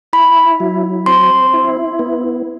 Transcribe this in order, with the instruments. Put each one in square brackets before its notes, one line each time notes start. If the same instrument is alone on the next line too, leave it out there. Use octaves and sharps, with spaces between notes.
[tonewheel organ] E4 [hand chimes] B5
[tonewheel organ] F#3
[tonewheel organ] C4 [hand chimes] C6
[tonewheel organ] E4
B3